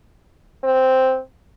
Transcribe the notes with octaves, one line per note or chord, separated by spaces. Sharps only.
C4